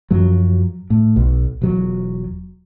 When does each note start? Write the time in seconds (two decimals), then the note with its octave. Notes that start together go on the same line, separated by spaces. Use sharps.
0.11 F#2 F3 F#3
0.90 A2
1.16 B1
1.62 E1 F#3